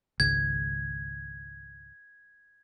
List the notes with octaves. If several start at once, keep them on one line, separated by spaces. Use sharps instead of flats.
G#1 C#2 G#6